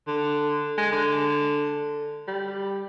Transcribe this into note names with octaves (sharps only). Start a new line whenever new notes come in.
D3
G#3
D3
G3